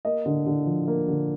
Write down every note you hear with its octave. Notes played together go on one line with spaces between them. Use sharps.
A#3 D#5
D3
D3
F3
A#3
D3